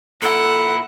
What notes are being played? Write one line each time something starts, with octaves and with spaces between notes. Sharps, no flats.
A#2 E4 A4 F#5